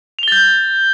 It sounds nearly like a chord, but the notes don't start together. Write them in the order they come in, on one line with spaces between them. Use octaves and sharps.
F7 G7 A6 G6